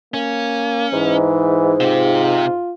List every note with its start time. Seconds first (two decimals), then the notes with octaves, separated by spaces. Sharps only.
0.14 A#3 C#4
0.93 G#2 E3
1.80 C3 F4 G4